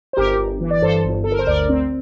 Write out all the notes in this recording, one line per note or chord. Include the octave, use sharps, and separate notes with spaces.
C5
G1 G4 A#4
G1
E3
D5
G2 A4 C5
G1
G1 A4
A#4
C5
D2 A#4 D5
C4